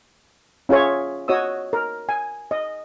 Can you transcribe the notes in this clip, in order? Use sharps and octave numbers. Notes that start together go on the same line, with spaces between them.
C#4 F4 G#4 C#5 E5
F#4 C#5 D#5 D#6 E6
A#4
G#5
D#5